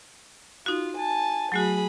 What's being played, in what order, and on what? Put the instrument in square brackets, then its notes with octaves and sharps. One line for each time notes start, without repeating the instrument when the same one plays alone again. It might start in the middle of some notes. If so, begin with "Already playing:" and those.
[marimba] D#4 F#4 [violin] F4
[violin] G#5 A5
[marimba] F#3 A3 F#4 [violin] G#4 B5